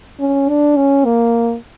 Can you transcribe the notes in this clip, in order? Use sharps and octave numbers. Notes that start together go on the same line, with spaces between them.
C#4
D4
C#4
A#3